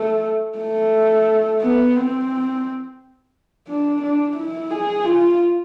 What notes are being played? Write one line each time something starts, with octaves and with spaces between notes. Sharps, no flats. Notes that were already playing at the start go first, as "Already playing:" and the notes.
Already playing: A3
A3
B3
C4
D4
D4
E4
G#4
F4